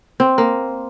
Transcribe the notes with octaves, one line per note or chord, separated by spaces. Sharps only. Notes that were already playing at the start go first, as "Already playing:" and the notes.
C4
A#3